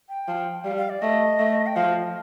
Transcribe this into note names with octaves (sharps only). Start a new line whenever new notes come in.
G5
F3
G3 F5
F5
D5
A3 D#5
A3
G5
F3 F5